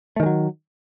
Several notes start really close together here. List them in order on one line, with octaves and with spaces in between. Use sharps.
A3 D#3 G#3 F#3